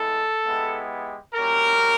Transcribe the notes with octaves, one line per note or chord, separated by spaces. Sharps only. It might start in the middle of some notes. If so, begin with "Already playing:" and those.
Already playing: G#3 B3 E4 A4
G#3 B3 E4 G4
G3 A#3 C#4 F#4 A#4